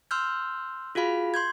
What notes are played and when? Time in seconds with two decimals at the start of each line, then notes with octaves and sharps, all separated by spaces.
0.11 C6 E6 F6 G6
0.95 F4 F#4 G#4 F5 B5
1.34 C6 G6 G#6